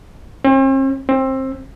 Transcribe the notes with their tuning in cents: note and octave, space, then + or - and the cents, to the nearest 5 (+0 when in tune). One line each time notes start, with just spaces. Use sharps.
C4 +45
C4 +20